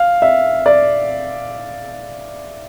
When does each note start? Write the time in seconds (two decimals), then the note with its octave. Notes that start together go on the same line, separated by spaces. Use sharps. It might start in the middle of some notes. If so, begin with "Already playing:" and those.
Already playing: F5
0.22 E5
0.66 D5